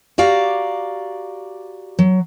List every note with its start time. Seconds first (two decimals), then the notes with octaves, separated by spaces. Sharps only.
0.18 F#4 G4 D5 F5 A#5
1.99 F#3